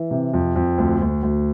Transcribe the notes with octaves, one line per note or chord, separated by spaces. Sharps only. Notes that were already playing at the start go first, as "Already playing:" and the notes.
Already playing: E3
C3
F2
F2
D2
D2
D2